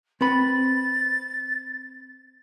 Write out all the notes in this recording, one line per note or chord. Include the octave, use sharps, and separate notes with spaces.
C4 B4 B5 A6